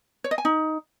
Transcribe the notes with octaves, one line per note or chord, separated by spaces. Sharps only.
C#5
D#5
G#5
D#4